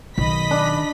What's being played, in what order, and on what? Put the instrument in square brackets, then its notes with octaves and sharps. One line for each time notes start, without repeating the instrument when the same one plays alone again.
[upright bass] B1 [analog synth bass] D#3 [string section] D#5 B5 B6
[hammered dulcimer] D4